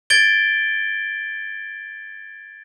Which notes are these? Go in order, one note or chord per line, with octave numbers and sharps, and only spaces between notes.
G#6 A6 D7 G7